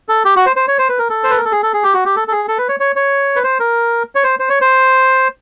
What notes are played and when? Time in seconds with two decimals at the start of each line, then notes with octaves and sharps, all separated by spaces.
0.09 A4
0.25 G4
0.36 F#4
0.46 C5
0.56 C5
0.68 C#5
0.79 C5
0.89 B4
0.99 A#4
1.10 A4
1.24 C5
1.30 B4
1.37 A#4
1.45 A4
1.52 G#4
1.63 A4
1.73 G#4
1.83 G4
1.94 F#4
2.05 G4
2.16 A4
2.28 A4
2.32 G#4
2.48 A4
2.58 B4
2.69 C#5
2.80 C#5
2.96 C#5
3.36 B4
3.44 C5
3.60 A#4
4.15 C#5
4.24 C5
4.39 C5
4.49 C#5
4.61 C5